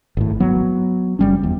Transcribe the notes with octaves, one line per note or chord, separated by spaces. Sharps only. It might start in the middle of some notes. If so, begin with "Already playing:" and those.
G#1 A2
F#3 B3
F#1 G3 C#4
E2